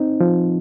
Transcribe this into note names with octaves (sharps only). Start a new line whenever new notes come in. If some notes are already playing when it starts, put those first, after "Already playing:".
Already playing: C4 D#4
F3